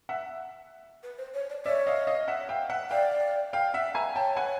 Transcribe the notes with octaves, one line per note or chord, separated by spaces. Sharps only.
E5 F#5
B4
C5
C#5
D5
C#5 D5 E5
D#5 F5
D#5 F5
E5 F#5
F5 G5
E5 F#5
D5 F5 G5
F5 G5
E5 F#5
G#5 A#5
C#5 G5 A5
F#5 G#5